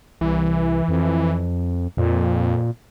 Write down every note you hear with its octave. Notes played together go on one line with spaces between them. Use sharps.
C2 E3
F2
F2 A#2